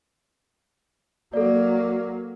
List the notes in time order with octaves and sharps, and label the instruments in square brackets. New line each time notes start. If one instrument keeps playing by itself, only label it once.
[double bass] F#3 A#3 [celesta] A4 D5